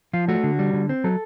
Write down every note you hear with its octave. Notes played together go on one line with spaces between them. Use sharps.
F3 F4
A3 F#4
D3
G3
D3
C4
F#3 A4